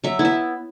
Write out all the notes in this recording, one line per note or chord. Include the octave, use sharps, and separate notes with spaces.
F#3 E5
B3 E4
E5